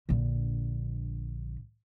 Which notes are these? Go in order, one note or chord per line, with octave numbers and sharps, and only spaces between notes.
A#1 D3